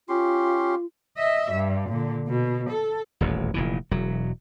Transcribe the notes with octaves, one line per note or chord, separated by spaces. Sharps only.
C#4 F4 G4 C6
D#5 E5
G2
A#2 D3
B2
A4
D#1 A1 E2
F1 A#2 E3
E1 F#3